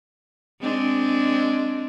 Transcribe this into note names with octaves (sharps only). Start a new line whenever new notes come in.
G#3 C4 D4